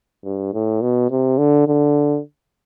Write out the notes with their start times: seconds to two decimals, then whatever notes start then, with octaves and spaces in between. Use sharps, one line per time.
0.24 G2
0.53 A2
0.82 B2
1.10 C3
1.38 D3
1.67 D3